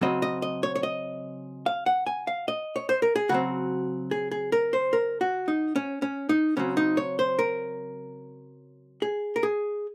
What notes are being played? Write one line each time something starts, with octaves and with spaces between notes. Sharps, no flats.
C#3 F#3 C4 D#5
D#5
D#5
C#5
C#5
D#5
F5
F#5
G#5
F5
D#5
C#5
C5
A#4
G#4
C#3 F#3 C4 F#4
G#4
G#4
A#4
C5
A#4
F#4
D#4
C#4
C#4
D#4
C#3 F#3 C4 C#4
D#4
C#5
C5
A#4
G#4
A#4
G#4